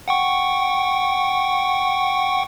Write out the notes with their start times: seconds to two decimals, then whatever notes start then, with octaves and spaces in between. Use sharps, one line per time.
0.08 F#5 G5 C#6